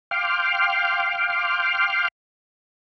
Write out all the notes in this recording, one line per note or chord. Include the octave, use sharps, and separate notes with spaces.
F5 G5 C6 D6 F6